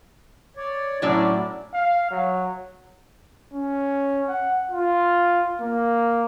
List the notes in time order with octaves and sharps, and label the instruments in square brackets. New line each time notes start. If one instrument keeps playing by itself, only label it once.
[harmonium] C#5 D5
[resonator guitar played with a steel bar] A2 F#3 D5 [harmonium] C#4 D4 E4
[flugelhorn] F5
F#3
[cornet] C#4
F#5
F4
A#3